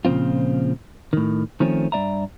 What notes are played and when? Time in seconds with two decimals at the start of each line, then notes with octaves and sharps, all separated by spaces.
0.05 A#2 C#3 F3 C4 F4
1.13 A2 D#3
1.60 D#3 F3 A3 C4 C#4
1.92 G2 G#3 D5 E5 A#5